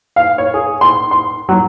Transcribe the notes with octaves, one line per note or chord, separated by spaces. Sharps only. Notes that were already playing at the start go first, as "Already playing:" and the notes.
F5
C#5
G#4
C6
C6
F#3